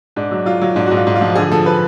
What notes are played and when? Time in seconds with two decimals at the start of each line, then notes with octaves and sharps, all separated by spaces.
0.16 G#2 D4
0.31 F#3
0.46 F#3 F4
0.61 F#3
0.76 G#2 D4
0.86 F#4
0.91 G#2
0.97 F4
1.07 G#2
1.16 F4
1.21 F3
1.35 D3 G#4
1.52 F3 A4
1.66 B4